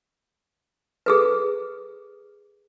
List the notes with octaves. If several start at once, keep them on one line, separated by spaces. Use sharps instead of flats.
G#4 A4 B4